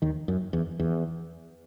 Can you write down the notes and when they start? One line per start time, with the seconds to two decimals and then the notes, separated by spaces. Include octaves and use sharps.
0.02 D#2 D#3
0.28 F#2
0.53 E2
0.79 E2